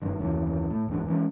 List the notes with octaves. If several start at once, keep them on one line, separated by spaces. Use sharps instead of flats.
F#1 G2 D#3
F#1 D#2 C#3 E3
A2
D1 E2 G#2 D4
E3 G#3 C#4